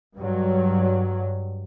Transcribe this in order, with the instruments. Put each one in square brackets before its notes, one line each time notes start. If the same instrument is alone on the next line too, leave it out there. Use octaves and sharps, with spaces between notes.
[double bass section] G2 F#3